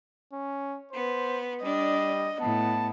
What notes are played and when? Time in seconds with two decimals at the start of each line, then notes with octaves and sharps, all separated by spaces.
0.33 C#4
0.91 B3 C5
1.63 G3 D4 D#5
2.42 A2 B3 A5